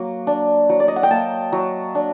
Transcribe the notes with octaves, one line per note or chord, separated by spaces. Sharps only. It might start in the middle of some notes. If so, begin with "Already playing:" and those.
Already playing: F#3 A#3
D4
F#3
D5
D#5
F#5
G5
A#3 A5
F#3
D4